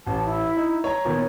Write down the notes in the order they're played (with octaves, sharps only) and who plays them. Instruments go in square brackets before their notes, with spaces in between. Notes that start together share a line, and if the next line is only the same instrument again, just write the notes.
[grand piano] A1 [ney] A5
[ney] E4
[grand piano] D#4
C#5 A#5
[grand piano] A#2 D#3 B3 [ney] C#5